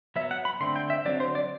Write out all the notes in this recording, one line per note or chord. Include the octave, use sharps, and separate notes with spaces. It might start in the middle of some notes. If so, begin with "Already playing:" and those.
F#3 B3 E5
F#5
B5
D3 A3 C4 C6
G5
E5
D3 F#3 C4 D5
C5
D5